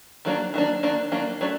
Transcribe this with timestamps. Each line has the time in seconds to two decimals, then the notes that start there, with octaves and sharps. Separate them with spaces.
0.25 D#3 F#3 A#3 D4
0.54 D#3 F#3 A#3 D4
0.83 D#3 F#3 A#3 D4
1.12 D#3 F#3 A#3 D4
1.41 F#3 A3 D4